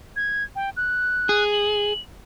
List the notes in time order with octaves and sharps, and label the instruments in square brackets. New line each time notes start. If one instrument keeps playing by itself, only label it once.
[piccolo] G#6
G5
F#6
[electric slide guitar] G#4
[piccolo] F#7